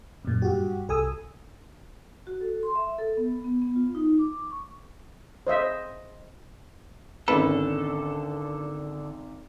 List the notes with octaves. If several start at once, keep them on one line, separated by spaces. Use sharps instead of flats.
F#2 A#2
G2 F#4 G4
C2 A4 G#5 D#6 E6
F#4
A4
C6
E5
A4
B3
B3
B3
F4
D#4
D6
C#6
C5 D#5 E5
G#1 D3 C#4 A4 B4